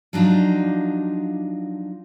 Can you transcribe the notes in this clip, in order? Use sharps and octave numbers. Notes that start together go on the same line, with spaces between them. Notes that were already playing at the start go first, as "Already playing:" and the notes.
F3 F#3 D4 D#4 F4